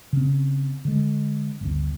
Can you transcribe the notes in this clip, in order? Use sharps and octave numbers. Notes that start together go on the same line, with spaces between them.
C#3 C4
D3 G#3
G1 D2